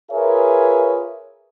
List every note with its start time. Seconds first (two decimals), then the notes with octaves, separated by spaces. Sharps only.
0.11 F4 G#4 A#4 B4 C#5 E5